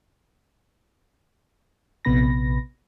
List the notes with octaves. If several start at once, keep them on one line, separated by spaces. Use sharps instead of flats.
A#1 C3 B3 B5 A#6